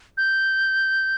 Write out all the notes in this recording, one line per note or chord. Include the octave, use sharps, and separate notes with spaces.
G6